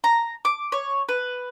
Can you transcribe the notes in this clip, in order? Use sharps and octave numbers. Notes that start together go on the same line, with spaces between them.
A#5
D6
C#5
B4